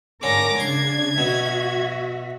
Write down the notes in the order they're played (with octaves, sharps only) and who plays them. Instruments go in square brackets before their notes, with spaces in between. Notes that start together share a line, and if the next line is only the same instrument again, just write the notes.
[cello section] G#2 A#4 [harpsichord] D3 C#4 [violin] D6 A#6
[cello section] C#3 D4 [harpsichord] C6 [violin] G#6
[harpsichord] B2 [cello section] F#4 E5